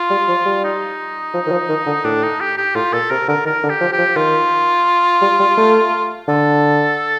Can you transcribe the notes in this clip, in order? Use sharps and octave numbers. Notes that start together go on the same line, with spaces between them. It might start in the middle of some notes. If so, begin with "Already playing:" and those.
Already playing: F4
G3
F3
G3
D#4
F3
D#3
F3
D#3
D3
A2 D4
D#4
G4
G4
A2 F4
A#2 A4
C3 A#4
D3 A#4
D#3 A#4
D3
G4
F3
G4
F3
D#3 F4
G3
G3
A3
D3 A4